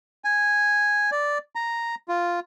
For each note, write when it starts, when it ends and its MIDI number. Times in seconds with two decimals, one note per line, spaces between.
0.24 1.10 80
1.12 1.38 74
1.55 1.95 82
2.08 2.40 65